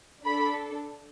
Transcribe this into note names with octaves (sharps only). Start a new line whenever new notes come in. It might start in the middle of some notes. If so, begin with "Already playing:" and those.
D4 A4 B5